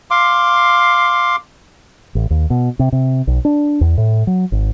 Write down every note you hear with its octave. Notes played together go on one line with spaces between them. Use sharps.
F5 C6 D6
A1
D#2
B2
C3
C3
B1
D4
E2
A2
F#3
G#1